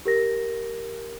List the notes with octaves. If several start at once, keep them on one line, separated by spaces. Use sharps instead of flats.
G4 A#4 A#6